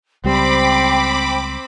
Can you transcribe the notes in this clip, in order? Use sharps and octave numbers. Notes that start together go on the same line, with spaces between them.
C#2 G3 C4 C5 G5 B5 D6